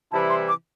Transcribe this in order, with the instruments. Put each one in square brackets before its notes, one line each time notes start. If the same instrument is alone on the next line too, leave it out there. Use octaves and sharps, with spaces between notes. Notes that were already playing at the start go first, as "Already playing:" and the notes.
[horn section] C3 E3 G3 E4 [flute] A5
[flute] C6
D6